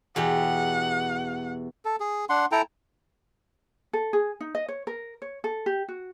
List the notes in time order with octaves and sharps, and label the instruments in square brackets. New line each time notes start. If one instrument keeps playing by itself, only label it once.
[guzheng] E2 B2 G4 [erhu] F#5
[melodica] A4
G#4
D4 F#5 C6
E4 A4 G5 A#5
[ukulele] A4
G#4
D#4
D#5
C#5
A#4
C#5
A4
G4
F#4